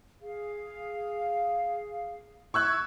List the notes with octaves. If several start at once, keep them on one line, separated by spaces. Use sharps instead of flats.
G#4 F5
E5 C#6 E6 F#6 G#6